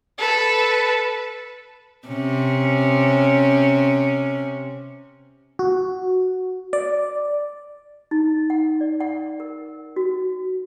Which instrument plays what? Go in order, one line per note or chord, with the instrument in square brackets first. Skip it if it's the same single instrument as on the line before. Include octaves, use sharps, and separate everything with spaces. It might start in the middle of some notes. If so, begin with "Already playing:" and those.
[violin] A4 B4
[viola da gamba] C3 C#4
[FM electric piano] F#4
D5
[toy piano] D#4
F#5
D5
F#5
A#4
F#4